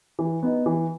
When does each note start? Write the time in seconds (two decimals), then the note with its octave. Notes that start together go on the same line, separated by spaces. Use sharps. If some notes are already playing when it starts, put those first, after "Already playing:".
0.19 E3
0.43 B3 D#4
0.66 E3